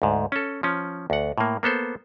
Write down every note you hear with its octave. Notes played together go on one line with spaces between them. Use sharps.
D2 G#2
C#4 A4
F3 C#4
D2 F#5
A2 A#3
A#3 B3 A4 C5